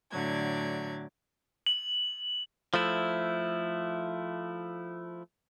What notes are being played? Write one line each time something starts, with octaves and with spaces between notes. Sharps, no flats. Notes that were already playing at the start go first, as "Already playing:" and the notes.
A2 D3 F#3 D5 G#6
F#7
F3 A3 E4